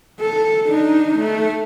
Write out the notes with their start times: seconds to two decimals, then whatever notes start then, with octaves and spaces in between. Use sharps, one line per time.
0.21 A4
0.67 D4 D#4
1.19 A3